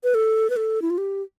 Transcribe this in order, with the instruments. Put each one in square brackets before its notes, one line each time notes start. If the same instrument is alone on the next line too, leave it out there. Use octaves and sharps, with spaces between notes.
[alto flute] B4
A4
B4
A4
E4
F4
G4